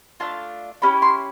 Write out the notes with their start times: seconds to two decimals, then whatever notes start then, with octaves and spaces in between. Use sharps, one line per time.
0.20 A3 D4 F4 A5
0.82 C#4 E4 G4 B5
1.02 C6